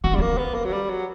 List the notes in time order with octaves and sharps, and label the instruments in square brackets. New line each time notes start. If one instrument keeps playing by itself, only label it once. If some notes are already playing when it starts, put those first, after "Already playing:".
[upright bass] C#4 [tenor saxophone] F#4
[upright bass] D4
[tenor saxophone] G3
[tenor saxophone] A#3 [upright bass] C#4
[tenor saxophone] B3
A#3
F#3
G3
F#3